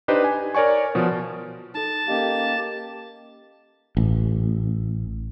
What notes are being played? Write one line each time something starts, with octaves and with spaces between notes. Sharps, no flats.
D4 D#4 G4 B4 C5 D#5
G#5
A#4 C#5 D5 G#5 C#6
B2 F3
D#4 A4 A5
A#3 C#4 G4 D#5 F5
A1